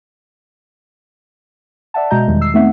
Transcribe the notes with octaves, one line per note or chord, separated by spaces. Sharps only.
D5 E5 F#5 A5
B2 G#3 F#4 D#5 A#5 G6
E2 D#3 G3 G#3
E6 C7
A3 B3 C4 D#4 E5 F#5